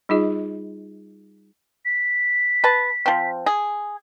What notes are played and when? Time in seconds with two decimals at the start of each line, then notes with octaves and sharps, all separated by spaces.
0.09 G3 D#4 F4 G#4 D#5
1.85 B6
2.64 B4 A5
3.06 F3 C4
3.46 G#4